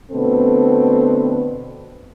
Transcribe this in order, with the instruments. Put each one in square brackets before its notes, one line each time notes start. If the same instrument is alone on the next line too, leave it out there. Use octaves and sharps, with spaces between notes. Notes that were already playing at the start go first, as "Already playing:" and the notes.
[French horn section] B2 D3 A3 C4 A4 B4